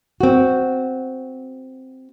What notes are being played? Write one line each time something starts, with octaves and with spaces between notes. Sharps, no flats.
C4 F#4